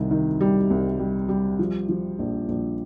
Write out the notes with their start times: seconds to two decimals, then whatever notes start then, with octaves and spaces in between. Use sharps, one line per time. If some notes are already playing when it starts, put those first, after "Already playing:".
Already playing: C2 C3 D#3
0.11 D#3
0.41 G3
0.70 C2
0.99 G3
1.29 G3
1.59 F3
1.89 F3
2.19 A#1
2.48 A#1